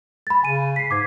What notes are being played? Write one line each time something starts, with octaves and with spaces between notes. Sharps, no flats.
B5 A6
C#3 G#5 D#7
B6 C7
G#2 D6 G#6 B6